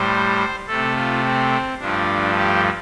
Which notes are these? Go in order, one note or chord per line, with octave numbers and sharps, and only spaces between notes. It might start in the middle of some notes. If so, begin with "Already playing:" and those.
Already playing: A2 G3 C5
C3 A3 A4
F4
C4
G2 F3 A3 D4
G4